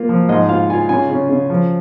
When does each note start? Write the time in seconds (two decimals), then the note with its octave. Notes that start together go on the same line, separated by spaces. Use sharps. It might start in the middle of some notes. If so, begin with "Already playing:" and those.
Already playing: A#3 F4
0.09 F3
0.29 G#2 D#5
0.49 F4 F5
0.70 F4 G#5
0.89 C#3 G#5
1.10 C#3
1.29 C#3
1.50 F3